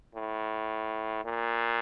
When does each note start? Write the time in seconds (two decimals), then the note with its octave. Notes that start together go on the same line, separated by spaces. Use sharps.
0.15 A2
1.25 A#2